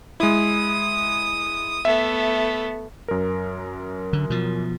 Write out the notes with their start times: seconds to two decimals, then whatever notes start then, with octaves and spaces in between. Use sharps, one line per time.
0.20 G#3 E4 D#6
1.85 A3 B3 E5
3.08 F#2 A#4
4.13 D3
4.30 B2 F3